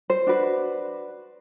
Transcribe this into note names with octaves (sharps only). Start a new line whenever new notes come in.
C5
D4 F#4 B4